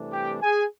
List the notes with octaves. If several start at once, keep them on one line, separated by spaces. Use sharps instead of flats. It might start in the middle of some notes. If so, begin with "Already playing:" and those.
Already playing: C2 C3 E3 A3 D4
G4 G5
G#4 G#5